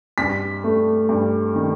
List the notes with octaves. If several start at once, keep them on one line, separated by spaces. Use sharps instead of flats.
G2 B6
A3
G2
D#3